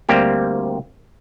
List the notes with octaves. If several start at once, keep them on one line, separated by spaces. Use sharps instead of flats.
D2 G3 A#3 C4 G4